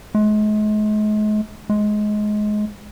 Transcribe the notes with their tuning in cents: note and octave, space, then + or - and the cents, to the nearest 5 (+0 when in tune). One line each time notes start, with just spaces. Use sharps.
G#3 +40
G#3 +20